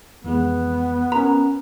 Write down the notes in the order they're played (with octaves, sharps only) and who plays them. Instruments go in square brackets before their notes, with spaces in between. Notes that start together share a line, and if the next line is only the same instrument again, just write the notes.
[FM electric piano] F2 E3 G#3 [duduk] B3
[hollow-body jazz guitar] C#4 B5 [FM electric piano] A#4 [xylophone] A#5